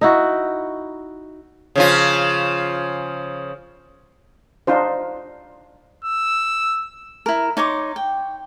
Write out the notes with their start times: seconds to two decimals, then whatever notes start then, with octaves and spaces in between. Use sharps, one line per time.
0.01 D#4 E4 F#4
1.76 C#3 F3 F4
4.67 D4 D#4 F4 C5
6.05 E6
7.26 E4 A#4
7.57 D#4 C#5 C6 D6
7.96 G5